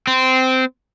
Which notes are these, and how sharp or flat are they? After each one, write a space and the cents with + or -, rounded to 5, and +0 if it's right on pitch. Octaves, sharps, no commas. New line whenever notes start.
C4 -15